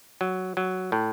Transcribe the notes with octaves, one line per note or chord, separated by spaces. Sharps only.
F#3
F#3
A2